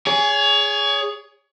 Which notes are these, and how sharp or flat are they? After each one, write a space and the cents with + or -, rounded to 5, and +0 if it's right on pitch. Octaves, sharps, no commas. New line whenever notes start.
G#4 +0 C#5 +35